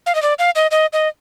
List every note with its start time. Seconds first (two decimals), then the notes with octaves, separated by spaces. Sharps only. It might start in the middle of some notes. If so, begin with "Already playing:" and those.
0.06 F5
0.15 D#5
0.22 D5
0.39 F5
0.56 D#5
0.71 D#5
0.93 D#5